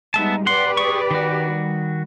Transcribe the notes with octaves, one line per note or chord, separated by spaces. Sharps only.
G3 G#3 B3 D#4 E5 A5
G4 B4 D5 F#5 C6
G#4 C#6
D#3 F#4
G3